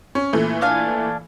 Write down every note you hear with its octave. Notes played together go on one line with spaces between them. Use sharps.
C#4
A#2 E3 A3
D4 F5 G#5